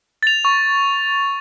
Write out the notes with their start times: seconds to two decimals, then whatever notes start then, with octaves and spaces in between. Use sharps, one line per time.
0.23 A6 F7
0.45 C#6